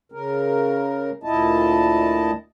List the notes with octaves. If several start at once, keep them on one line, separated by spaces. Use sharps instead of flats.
C#3 A#4
D2 A#2 E4 D#5 A5